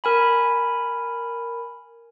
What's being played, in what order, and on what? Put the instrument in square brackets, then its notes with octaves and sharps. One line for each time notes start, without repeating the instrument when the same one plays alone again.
[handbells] A#4 G#5 B5